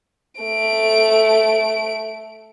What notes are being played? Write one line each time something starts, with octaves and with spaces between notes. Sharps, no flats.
A3 D7